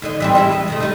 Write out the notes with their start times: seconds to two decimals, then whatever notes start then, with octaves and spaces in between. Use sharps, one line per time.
0.02 D#2 D3 D#5
0.20 E3 G3 C4
0.35 G3 G#3 E4
0.52 D#5
0.68 C3 D#3 A3
0.80 C#3 G3 D#4